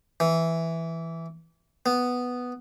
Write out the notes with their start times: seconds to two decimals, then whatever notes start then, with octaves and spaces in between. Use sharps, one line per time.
0.20 E3
1.86 B3